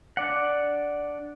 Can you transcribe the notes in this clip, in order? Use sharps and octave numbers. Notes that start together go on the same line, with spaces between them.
D4 D5 F#5